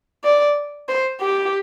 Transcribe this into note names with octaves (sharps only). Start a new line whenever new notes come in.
D5
C5
G4